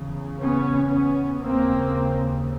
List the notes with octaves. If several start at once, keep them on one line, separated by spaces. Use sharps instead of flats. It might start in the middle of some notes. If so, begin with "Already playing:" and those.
Already playing: E2 C#3
B3 C#4
B3 C#4
D#2 C#3 A#3 C4